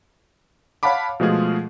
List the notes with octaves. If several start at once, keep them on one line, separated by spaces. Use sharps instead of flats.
C#5 F5 F#5 A5 B5 D6
B2 F3 G#3 A3 F4 G#4